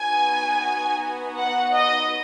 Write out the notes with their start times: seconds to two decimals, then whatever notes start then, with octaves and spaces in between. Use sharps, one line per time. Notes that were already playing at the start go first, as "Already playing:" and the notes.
Already playing: B3 D#4 F#4 G#5
1.36 F#5
1.74 D#5